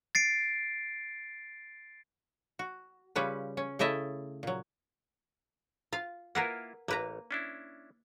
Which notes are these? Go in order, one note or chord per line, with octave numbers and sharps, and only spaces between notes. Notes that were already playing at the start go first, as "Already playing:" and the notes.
A6 C7 D7
F#4
C#3 G3 C#4 F4 B4
C#4
C#3 A3 E4 D#5 E5 A5
A#2 F#3
F4 F5
A#3 E4 F4 A#4 B4 F#5
A1 A#3 B4 A#5
C#4 D4 E4